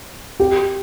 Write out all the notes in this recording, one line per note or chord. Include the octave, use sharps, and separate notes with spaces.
G4